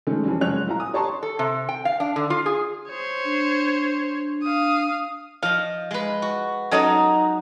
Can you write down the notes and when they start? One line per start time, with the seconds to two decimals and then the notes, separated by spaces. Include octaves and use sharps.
0.07 D#3 F3 G#3 A3 C#4
0.24 F2 E3 G3 C#4
0.41 F#1 F2 G#3 C#5 F#6 F7
0.66 D#1 E4 F4 A#5
0.79 G#5 D#6
0.93 G4 C#5 A5 A#5 C6 C#6
1.23 A4
1.39 C3
1.69 G5
1.85 F5
2.00 D4
2.16 D3
2.30 F4
2.46 G#4
2.89 C5 C#5
3.25 D4
4.43 F5 D#6
5.43 F3 D#5 F5
5.91 G#3 B4
6.22 F#4
6.71 F#3 C#4 D#4 A4 D#5